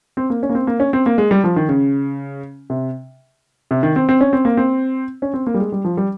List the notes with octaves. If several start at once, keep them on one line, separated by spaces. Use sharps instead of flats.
C4
A#3
C#4
A#3
C4
A#3
C#4
C4
A#3
G#3
G3
F3
D#3
C#3
C3
C3
D#3
C4
C4
C#4
C4
A#3
C4
C#4
C4
A#3
G3
G#3
G3
F3
G3